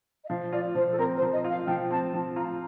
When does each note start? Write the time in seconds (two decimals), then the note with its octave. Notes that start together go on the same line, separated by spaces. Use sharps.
0.24 D#5
0.29 F3 F5
0.52 F4 D5
0.75 F3 C5
0.90 A4
0.98 C4 A#4
1.16 C5
1.21 F3
1.33 D#5
1.44 F4
1.50 F5
1.67 F3 G5
1.91 C4 A5
2.14 F3 A5
2.36 F4 A#5